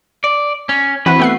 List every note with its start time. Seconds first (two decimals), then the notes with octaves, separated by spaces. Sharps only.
0.24 D5
0.69 C#4
1.06 E3 C4 F#4 B4
1.19 A3 B3 F#5 C7